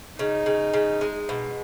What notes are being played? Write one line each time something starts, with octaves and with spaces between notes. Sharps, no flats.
C#3 D#4
C#3
C#3
G#3
B2